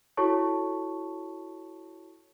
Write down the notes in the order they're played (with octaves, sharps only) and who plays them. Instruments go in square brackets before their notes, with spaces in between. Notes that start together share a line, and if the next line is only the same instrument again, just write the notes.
[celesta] E4 F#4 A4 C#5 A5 C#6